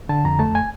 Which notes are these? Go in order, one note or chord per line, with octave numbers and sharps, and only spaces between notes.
D3 A5
F2 A#5
A3 A5
G#5